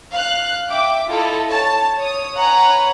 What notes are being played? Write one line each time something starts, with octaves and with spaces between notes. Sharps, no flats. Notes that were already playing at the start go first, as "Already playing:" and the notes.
F5 F#6
E5 G5 D6
E4 F4 A4 D#5
C#5 A5
C#5 D#6
B4 C#5 F#5 G#5 A#5